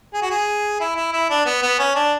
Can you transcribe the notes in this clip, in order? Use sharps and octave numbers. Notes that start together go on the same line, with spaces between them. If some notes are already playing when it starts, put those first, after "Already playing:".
G#4
F#4
G#4
E4
E4
E4
D4
B3
B3
C#4
D4